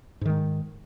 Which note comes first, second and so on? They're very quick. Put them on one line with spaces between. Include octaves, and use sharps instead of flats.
G#2 D#3 G#3